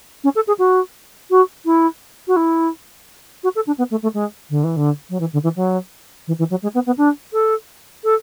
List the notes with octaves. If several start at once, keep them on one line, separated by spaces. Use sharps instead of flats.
C#4
A4
G#4
F#4
F#4
E4
F#4
E4
F#4
A4
D4
B3
A3
A3
G#3
D3
E3
D3
F#3
E3
D3
E3
F#3
E3
E3
F#3
G#3
B3
B3
D4
A4
A4